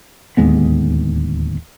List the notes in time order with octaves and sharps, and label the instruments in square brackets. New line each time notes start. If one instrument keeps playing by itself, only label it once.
[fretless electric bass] D1 D#2 G#3 B3